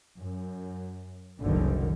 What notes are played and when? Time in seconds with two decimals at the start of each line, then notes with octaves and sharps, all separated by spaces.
0.18 F#2
1.42 F#1 C2 F#2 D3 D#3